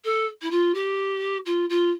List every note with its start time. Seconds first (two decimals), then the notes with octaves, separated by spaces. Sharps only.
0.05 A4
0.42 E4
0.51 F4
0.75 G4
1.46 F4
1.70 F4